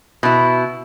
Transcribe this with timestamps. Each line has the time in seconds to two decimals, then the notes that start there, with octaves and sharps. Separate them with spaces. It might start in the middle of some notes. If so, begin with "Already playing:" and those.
0.23 B2 E4